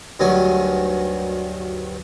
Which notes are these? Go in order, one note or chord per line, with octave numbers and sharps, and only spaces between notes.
D2 G2 D#3 F#3 G#5